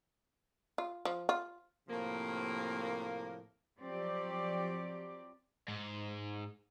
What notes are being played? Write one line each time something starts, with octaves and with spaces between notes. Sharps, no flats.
F4
F3
F4
A2 C3 F3 A#3
F3 F#3 C4 G4 D5
G#2